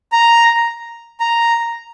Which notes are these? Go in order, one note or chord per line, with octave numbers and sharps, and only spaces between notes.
A#5
A#5